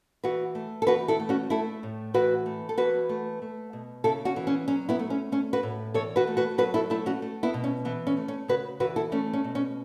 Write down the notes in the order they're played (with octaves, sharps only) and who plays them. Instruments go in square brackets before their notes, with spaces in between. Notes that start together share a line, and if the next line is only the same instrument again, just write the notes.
[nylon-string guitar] E3 F#4 B4
A3
A4
E3 F#4 B4
E4 A4
A3
C#4 F#4
A3 E4 A4
A2
E3 F#4 B4
A3
A4
E3 F#4 B4
A3
A3
B2
C#3 E4 A4
C#4 F#4
E3
C#4
F#3 C#4
B3 E4
A3
C#4
A3 C#4
F#4 B4
A2
E3 A4 C#5
F#4 B4
A3
F#4 B4
F#3 F#4 B4
E4 A4
A3 E4 A4
C#4 F#4
A3
B3 E4
B2
C#4
E3 B3
C#4
A3
C#4
C#3 F#4 B4
E3 F#4 B4
E4 A4
A3 C#4
C#4
B2
C#4